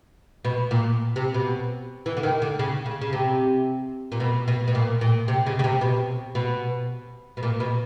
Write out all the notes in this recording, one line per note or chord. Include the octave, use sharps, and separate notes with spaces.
B2
A#2
C3
B2
E3
D3
D#3
D3
C#3
C#3
C#3
C3
A#2
B2
B2
B2
A#2
A#2
C3
C#3
C#3
C3
B2
B2
B2
A#2
B2